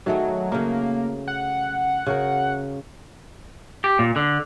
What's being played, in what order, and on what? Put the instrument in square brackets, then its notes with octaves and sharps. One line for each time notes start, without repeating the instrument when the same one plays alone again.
[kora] D#3 A3 G#4 [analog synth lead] F#3
[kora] C#3 F#3 [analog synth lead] A#3
[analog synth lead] F#5
[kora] C#3 F#4 A#4
[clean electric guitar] G4
A#2
D3